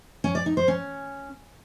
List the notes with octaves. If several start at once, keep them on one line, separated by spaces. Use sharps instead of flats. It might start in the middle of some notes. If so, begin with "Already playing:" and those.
C#4
D5
D#4
C5
C#4